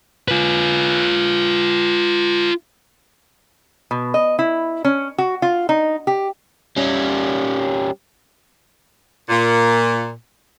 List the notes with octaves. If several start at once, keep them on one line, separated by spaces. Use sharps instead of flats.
F4 B4
B2
D#5
E4
C#4
F#4
F4
D#4
G4
G3 C#4
A#2